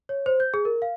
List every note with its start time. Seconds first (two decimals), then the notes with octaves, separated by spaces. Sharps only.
0.09 C#5
0.26 C5
0.40 G6
0.54 G#4
0.65 A#4
0.82 F5